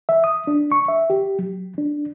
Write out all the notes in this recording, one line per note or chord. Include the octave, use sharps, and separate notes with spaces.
E5
D#6
D4
C#6
E5
G4
F#3
D4